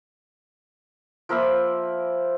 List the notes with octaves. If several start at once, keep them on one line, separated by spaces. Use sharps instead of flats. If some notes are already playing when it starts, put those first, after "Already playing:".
F3 A#3 E5 B5